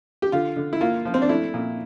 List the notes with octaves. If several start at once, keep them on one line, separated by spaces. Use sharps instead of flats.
G4
D3 F4
D3
E4
A#3 F4
F3
C4
D4
A3 E4
A#2